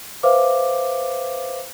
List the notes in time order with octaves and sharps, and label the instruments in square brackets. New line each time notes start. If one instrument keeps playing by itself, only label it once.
[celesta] B4 C5 E5 F5 D6